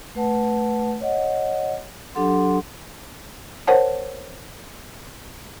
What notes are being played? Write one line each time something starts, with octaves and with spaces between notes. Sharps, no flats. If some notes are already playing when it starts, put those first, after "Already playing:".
A3 B4 F#5 A5
C#5 D#5 F#5
F#3 D4 G4 A4 F#5 C6
A#4 C5 C#5 F#5 A5